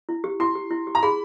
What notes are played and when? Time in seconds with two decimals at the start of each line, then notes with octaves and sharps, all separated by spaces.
0.09 E4
0.24 G4
0.40 E4 C6
0.55 G4
0.71 E4
0.87 G4
0.95 A#5
1.03 G#4 B5